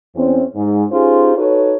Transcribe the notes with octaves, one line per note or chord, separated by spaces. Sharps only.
E2 C4 C#4
G#2
C#4 D#4 F4 G4 G#4 C5
D#4 F#4 A4 B4 C#5